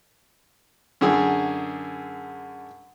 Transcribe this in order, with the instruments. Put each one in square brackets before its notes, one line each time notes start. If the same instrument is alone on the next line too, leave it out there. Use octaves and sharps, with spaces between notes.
[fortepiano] F#2 D3 G#4